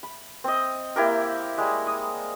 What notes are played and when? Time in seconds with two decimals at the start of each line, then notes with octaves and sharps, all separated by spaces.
0.03 B5
0.44 C4 D#5
0.96 A#3 E4 G4 A#4
1.58 G3 G#3
1.87 D#6